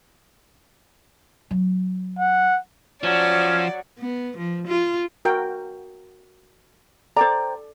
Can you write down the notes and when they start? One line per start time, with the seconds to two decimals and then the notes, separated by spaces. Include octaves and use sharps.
1.51 F#3
2.19 F#5
3.03 F3 F#3 C#4 D5
3.99 B3
4.37 F3
4.67 F4
5.25 F#4 A#4 G5
7.16 A4 C5 D5 G5 A#5